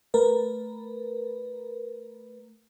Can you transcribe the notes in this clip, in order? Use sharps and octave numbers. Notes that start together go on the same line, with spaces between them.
A3 A#4 B4